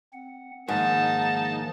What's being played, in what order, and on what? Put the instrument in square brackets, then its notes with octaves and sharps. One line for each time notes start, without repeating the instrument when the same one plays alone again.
[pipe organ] C4 F#5
[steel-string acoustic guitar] G#2 [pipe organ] D#3 F3 A#3 [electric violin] D#4 A5